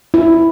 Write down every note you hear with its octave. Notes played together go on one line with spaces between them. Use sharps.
E4